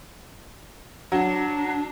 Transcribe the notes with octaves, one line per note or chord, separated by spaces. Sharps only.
F#3 D4